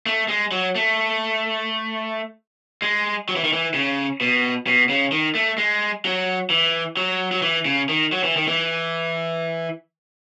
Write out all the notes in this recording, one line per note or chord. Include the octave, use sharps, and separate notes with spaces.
A3
G#3
F#3
A3
G#3
F#3
E3
D#3
E3
C#3
B2
B2
C#3
D#3
A3
G#3
F#3
E3
F#3
F#3
E3
C#3
D#3
F#3
E3
D#3
E3